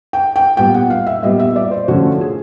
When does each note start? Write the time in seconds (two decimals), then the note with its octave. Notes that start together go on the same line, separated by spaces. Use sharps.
0.13 G5
0.36 G5
0.57 A#2 G3 B3 G5
0.74 F#5
0.90 F5
1.07 E5
1.22 A#2 G3 B3 D#5
1.39 E5
1.56 D5
1.71 C5
1.88 D3 F3 A3 C#4 F#4
2.21 G#4